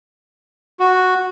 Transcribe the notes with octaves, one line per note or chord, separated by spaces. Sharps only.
F#4